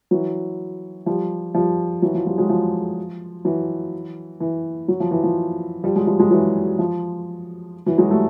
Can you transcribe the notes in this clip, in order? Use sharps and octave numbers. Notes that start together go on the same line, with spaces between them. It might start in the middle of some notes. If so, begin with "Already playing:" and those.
E3 F#3
F3 G3
F3 G3
E3 F#3
F3
F3 G3
F#3 G#3
F3
E3 F#3
E3
F#3
F3
E3
F3
F3 G3
F#3 G#3
F3 G3
F#3 G#3
E3 F#3
F3
E3 F#3
F#3 G#3
G3 A3